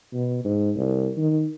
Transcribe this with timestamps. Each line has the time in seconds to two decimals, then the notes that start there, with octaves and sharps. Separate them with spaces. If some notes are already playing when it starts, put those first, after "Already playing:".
0.13 B2
0.44 G#2
0.76 C2
1.17 D#3